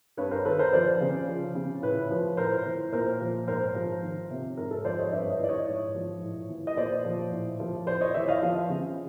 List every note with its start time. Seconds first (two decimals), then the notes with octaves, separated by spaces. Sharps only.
0.17 G2 B4 C#5
0.31 A#4 C5
0.45 D#3 A4 B4
0.59 A#4 C5
0.72 F3 C5 D5
1.01 C#3
1.27 F3
1.55 C#3
1.82 A2 B4 C#5
2.11 F3
2.37 A2 A#4 C5
2.66 E3
2.93 A#2 A#4 C5
3.20 F3
3.48 G#2 A#4 C5
3.75 F3
4.02 D#3
4.31 C3
4.57 G#2 A#4
4.71 A4
4.85 F3 C5 D5
4.99 C#5 D#5
5.12 G2 D5 E5
5.30 C#5 D#5
5.39 E3 D5
5.49 C#5 D#5
5.67 G#2
5.95 F3
6.22 A2
6.49 E3
6.67 D#5
6.77 A#2 C5 D5
7.05 F3
7.32 A2
7.60 F3
7.87 A2 C5 D5
8.01 C#5 D#5
8.14 E3 D5 E5
8.28 D#5 F5
8.42 F3
8.69 C#3